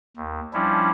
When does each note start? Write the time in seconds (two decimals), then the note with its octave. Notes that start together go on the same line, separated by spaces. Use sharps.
0.17 D#2
0.54 F3 G3 C#4 D4 E4